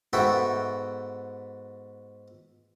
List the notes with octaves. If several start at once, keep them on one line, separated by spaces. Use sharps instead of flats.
G#2 B3 F#4 A4 E5 G5